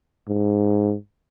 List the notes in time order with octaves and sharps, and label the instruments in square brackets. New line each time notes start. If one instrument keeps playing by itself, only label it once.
[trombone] G#2